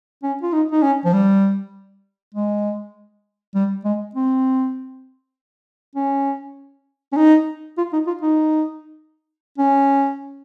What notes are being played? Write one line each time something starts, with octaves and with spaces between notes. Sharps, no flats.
C#4
F4
D#4
D#4
C#4
F3
G3
G#3
G3
G#3
C4
C#4
C#4
D#4
F4
D#4
F4
D#4
C#4